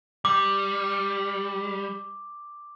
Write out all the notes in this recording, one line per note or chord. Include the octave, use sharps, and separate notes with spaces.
G3 D6